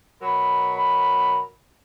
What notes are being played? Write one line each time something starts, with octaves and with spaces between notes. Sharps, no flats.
B2 F#3 A#4 B5